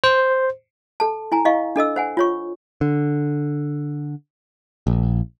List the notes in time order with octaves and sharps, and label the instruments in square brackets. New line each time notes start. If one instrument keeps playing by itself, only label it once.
[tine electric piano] C5
[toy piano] A4 A5
E4 G#5 A#5
E4 D#5 F5 C#6
D4 A4 D#5 E6
C5 F#5 G#5
F4 C#5 C#6
[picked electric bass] D3
A#1